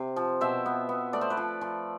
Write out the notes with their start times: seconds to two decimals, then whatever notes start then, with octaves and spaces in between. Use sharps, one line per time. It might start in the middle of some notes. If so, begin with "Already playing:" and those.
Already playing: C3
0.16 F3
0.41 B2 C5 E5
0.66 B3
0.89 B3
1.13 A3 D5
1.21 C5
1.30 B4 D5
1.37 F3
1.61 F3